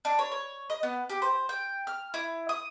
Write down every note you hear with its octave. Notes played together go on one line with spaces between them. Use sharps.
D4
C#5
C#5
D#5
B3
G4
C5
G5
F6
E4
D#6